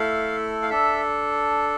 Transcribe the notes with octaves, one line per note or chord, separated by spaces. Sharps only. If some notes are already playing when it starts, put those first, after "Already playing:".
Already playing: A3 E4 A4 F5
F5
D4 A4 E5